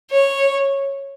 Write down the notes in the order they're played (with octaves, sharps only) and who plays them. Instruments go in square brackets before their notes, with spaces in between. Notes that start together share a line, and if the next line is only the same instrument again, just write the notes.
[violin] C#5